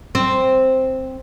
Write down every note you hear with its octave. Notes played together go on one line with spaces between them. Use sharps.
C4